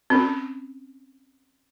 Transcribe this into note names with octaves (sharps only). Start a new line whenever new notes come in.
C4 C#4